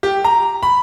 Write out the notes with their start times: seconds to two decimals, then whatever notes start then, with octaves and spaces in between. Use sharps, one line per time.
0.03 G4
0.24 A#5
0.63 B5